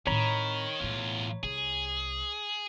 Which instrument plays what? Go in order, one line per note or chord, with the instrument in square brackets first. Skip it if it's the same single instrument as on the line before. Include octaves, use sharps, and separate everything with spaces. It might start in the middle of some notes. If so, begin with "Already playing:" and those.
[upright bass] A2 C4 [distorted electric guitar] D#3 [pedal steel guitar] C#5 A#5 B5
[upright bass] B1 A2 [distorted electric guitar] E2 F4
[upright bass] C2 [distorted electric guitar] G#4